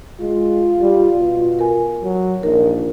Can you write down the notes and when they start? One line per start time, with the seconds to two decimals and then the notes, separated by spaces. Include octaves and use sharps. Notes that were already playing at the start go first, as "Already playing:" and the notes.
0.21 G#3 F4
0.81 G3
1.17 B2
1.59 A#4 G#5
2.03 F#3
2.43 A#1 D#4 A#4